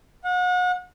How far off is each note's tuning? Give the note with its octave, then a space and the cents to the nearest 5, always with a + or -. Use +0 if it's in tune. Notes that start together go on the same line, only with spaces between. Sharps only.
F#5 -35